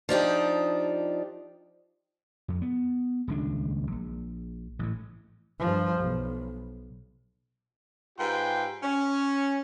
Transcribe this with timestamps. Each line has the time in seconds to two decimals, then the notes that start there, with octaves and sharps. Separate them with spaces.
0.09 F3 D4 D#4 G4
2.48 F2
2.62 B3
3.28 D#1 C#2 D4
3.92 A#1
4.79 A1 A2
5.59 G2 F3
6.00 B1
8.18 G#2 F4 G4 B4 G5 C6
8.83 C#4